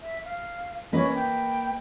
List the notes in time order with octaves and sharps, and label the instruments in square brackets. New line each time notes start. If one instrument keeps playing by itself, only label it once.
[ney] E5
F5
[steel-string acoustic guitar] A#3 B4 D#5 [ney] C#4
[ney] G5